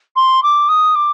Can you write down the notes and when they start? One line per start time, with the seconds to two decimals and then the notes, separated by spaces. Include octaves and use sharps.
0.16 C6
0.43 D6
0.69 D#6
0.95 D6